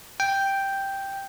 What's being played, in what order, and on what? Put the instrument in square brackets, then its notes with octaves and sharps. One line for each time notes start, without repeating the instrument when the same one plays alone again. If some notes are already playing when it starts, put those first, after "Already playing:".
[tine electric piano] G5